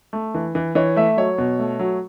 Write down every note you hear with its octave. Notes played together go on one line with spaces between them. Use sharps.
A3
E3
E3
E3 C#5
A3 E5
F#3 C#5
B2
A3
F#3